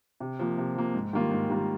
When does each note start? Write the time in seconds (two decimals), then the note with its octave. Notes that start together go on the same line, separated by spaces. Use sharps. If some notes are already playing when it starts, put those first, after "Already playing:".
0.20 C3
0.39 F3 A#3
0.58 C3
0.75 F3 A#3
0.94 G#2
1.13 D#3 G3 A#3 F4
1.31 G#2
1.50 D#3 G3 A#3 F4